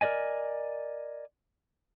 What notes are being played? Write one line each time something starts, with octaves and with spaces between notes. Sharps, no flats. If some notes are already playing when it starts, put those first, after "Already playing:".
A#4 B4 D5 D#5 G#5